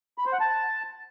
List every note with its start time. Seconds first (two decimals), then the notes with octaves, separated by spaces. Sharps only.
0.18 B5
0.26 C5
0.33 F#5
0.41 A5